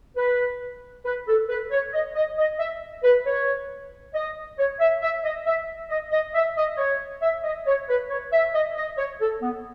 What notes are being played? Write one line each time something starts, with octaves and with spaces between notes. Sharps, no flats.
B4
B4
A4
B4
C#5
D#5
D#5
D#5
E5
B4
C#5
D#5
C#5
E5
E5
D#5
E5
D#5
D#5
E5
D#5
C#5
E5
D#5
C#5
B4
C#5
E5
D#5
D#5
C#5
A4
B3